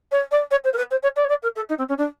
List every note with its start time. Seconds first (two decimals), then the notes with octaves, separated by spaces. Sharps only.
0.11 C#5
0.31 D5
0.51 C#5
0.64 C5
0.73 A#4
0.77 B4
0.91 C5
1.02 C#5
1.16 D5
1.24 C#5
1.29 D5
1.42 A#4
1.56 A4
1.69 D#4
1.78 C4
1.88 C#4
1.98 D4